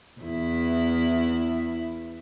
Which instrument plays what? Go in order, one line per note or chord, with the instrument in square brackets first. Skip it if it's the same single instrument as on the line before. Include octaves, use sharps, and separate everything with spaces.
[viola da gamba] E2 E4